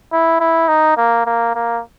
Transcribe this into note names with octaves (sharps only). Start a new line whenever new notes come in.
E4
E4
D#4
A#3
A#3
A#3